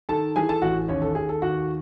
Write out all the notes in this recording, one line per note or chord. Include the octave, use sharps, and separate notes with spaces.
D#3 A4 A5
E3 G#4 G#5
A4 A5
A1 F#4 F#5
D#2 C#4 C#5
A4
D#2 G#4
A4
D#2 F#4 F#5